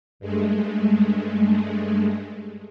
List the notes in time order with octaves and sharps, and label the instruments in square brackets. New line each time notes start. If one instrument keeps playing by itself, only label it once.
[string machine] G2 G#3 A3